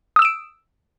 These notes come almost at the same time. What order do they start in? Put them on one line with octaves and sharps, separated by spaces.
D#6 E6 E7 D7